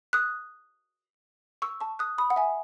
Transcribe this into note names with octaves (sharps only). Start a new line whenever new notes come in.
D#6 F#6
C#6 E6
A5 C#6
D#6 F#6
B5 D#6
F#5
E5 G#5